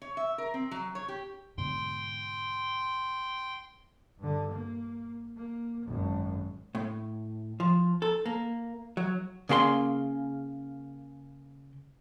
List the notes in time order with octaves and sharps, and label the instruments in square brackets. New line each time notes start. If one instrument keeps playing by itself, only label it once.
[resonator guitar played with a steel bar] C#5
E5
A#4
C4
F#3
C#5
G4
[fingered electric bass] G#2 B2 D3 [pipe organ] G5 C6
[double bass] G2 D3
A#3
A#3
G#1 F#2
[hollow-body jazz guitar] A2
F3
A4
A#3
F#3
C#3 A#3 F5 C6